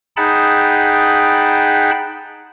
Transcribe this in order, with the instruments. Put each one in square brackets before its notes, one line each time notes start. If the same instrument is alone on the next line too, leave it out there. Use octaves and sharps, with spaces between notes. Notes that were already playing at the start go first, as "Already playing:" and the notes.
[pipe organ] D#4 G#4 F#5 G5 A5 B5